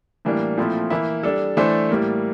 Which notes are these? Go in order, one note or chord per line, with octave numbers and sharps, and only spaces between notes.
A2 E3 G3 A#3 D4
A#2 F3 A3 C4 E4
E3 A#3 E4
G3 D4 A4
E3 A3 D4 A4 C5
A2 G3 A#3